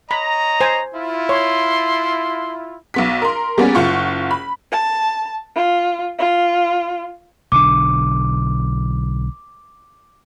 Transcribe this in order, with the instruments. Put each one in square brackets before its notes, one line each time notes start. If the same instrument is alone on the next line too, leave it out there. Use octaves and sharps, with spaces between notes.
[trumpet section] C#5 D#5 A#5 [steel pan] B5
[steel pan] C5 G#5
[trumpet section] E4 F4
[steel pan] C#5 [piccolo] C6
[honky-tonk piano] B1 B3 B6
A#4 C6
G3 A#3 B3 C#4 G#4
F#1 F4 F#5 C#6
B5
[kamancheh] A5
F4
F4
[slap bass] B1 D3 D4 [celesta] D6